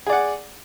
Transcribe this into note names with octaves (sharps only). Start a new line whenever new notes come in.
G#4 D5 F#5